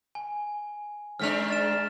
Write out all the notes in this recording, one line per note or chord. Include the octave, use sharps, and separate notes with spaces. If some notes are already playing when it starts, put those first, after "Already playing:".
G#5
G#2 G#3 D4 F6 B6 F7
F6 A6 E7